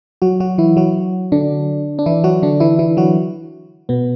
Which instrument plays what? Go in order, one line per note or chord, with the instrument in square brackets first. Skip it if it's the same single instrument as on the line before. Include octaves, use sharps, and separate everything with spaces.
[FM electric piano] F#3 F#4
F#3 F#4
E3 E4
F#3 F#4
D3 D4
D4
E3 E4
F#3 F#4
D3 D4
E3 E4
E3 E4
F#3 F#4
B2 B3